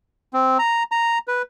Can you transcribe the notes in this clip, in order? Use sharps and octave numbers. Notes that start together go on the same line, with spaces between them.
C4
A#5
A#5
B4